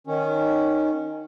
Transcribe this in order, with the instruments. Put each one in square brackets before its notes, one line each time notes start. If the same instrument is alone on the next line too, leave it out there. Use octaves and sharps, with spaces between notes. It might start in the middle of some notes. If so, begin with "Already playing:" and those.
[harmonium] D#3 C#4